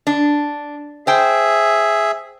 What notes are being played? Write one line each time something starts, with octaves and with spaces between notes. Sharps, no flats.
D4
G#4 C5 E5 G5